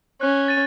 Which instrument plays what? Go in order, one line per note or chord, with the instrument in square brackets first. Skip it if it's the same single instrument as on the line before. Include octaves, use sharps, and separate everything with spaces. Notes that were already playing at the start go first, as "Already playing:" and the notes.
[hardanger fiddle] C#4 [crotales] F#6
[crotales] A6 D#7